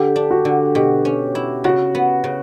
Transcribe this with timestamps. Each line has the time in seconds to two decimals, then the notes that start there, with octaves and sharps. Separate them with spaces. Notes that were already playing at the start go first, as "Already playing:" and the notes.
Already playing: D3 G4
0.16 D4
0.31 F#4
0.45 D3
0.75 B2 G4
1.05 C#4
1.35 E4
1.64 C#3 F#4
1.95 B3
2.24 C#3